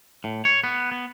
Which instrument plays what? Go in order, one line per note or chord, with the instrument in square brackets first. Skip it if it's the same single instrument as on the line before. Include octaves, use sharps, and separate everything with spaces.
[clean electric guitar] A2
C#5
B3
B3